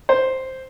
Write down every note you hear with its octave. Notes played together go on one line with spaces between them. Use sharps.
C5